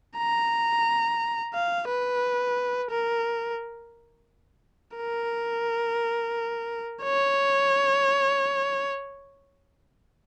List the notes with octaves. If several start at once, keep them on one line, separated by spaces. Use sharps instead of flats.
A#5
F5
B4
A#4
A#4
C#5